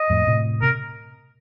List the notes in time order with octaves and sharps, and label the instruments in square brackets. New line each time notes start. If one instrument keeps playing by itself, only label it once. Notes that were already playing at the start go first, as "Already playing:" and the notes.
Already playing: [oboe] D#5
[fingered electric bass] F2 A2
A2 C3
[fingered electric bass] C3 [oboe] A#4